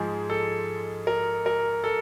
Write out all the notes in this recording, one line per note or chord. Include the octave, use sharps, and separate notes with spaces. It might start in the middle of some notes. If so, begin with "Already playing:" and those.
Already playing: G#2 F3 G#3 G#4
A4
A#4
A#4
A4